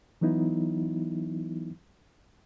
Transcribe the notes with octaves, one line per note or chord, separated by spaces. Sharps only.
E3 F#3 B3 D#4 E4